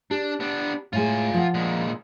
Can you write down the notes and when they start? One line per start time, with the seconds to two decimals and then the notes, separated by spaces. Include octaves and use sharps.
0.11 D4 G4
0.40 B3 D4
0.93 A2 G#3 F4 G#5
1.34 F3 F#5
1.54 A#2 G#3